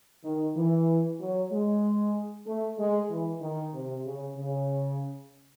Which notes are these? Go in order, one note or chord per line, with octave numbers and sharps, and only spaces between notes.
D#3
E3
F#3
G#3
A3
G#3
E3
D#3
C3
C#3
C#3